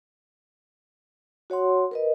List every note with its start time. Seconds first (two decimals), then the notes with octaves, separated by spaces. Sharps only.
1.50 F#4 C#5 F#5 C6
1.91 A#4 B4 D#5